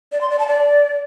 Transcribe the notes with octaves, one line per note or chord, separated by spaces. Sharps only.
D5
C6
D5
A5
D5